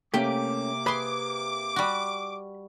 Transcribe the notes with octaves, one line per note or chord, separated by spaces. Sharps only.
C3 A3 A#3 C#4 G4 G5 D6
G#4 B4 B5 C6
G3 F#4